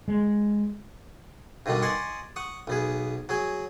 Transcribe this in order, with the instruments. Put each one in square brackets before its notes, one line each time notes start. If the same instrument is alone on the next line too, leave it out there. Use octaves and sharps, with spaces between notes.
[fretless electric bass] G#3
[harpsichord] G2 B2 D3 D#3 D4
D5 D#5 F#5 G#5 C6 C#6
F#5 C#6 D#6
B1 B3 G#4
F#3 G#4 G#5